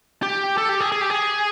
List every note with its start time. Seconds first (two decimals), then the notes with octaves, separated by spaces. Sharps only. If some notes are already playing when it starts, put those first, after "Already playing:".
0.23 G4
0.58 A4
0.69 G4
0.80 G#4
0.92 G#4
1.01 G4
1.10 G#4